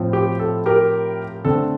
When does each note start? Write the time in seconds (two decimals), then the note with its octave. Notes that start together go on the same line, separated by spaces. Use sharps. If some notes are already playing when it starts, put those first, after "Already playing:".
Already playing: A2 F3 C4
0.13 G4
0.39 A4
0.66 G4 A#4
1.45 D3 A3 C4 A4